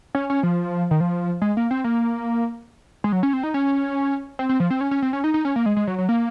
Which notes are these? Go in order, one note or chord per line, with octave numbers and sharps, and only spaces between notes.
C#4
C#4
F3
D#3
F3
G#3
A#3
C4
A#3
G#3
F#3
C#4
C4
D#4
C#4
C4
C4
F3
C4
C#4
C#4
C4
C#4
D#4
D#4
C#4
A#3
G#3
G#3
F#3
F#3
A#3